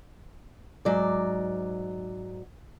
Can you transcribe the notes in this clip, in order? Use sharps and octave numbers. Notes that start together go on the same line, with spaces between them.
G#2 F#3 D5